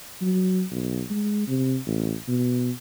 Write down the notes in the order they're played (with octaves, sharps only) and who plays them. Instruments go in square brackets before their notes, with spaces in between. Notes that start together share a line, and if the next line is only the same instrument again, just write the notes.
[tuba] F#3
B1
G#3
C3
A1
B2